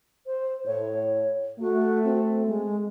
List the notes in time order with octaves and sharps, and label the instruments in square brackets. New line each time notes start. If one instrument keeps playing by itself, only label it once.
[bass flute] C5
[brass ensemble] A2 [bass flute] C#5
[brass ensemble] A3 [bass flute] F#4
[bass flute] C4
G#3